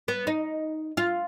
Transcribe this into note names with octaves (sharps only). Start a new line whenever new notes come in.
B3
D#4
F4